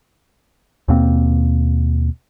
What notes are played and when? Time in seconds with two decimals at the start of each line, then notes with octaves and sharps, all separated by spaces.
0.88 D#2 B2 A#3 C4